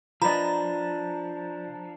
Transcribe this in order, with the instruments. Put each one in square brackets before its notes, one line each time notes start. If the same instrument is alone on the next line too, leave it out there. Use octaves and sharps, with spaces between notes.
[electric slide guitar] F3 D4 [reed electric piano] F4 D5 [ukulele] B4 D#5 [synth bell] A#5